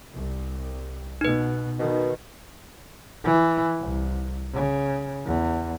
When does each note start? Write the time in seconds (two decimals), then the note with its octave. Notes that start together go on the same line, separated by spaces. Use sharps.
0.14 C2
1.21 B2 D#4 B4
1.79 B2 D#3
3.24 E3
3.80 C2
4.54 C#3
5.26 E2